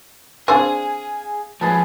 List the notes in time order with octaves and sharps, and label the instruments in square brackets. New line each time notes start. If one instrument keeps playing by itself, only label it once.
[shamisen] C4 D4 C5 [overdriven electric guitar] G#4 [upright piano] F5 G#5
[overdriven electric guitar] F3 C#4 [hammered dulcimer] G#4 B4 A5